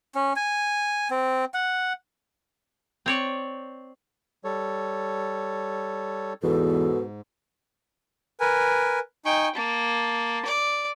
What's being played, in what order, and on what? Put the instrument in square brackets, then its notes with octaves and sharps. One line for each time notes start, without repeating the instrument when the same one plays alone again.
[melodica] C#4
G#5
C4
F#5
[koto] C4 C#5 D5
[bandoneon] G3 A4 C#5
[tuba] E2 [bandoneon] G#2 [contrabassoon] B2 [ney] A4
[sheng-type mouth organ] A#4 B4 G#5
[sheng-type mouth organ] D#4 G#5 C#6 [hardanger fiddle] G5
[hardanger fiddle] A#3 [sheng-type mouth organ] A5
[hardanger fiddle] D5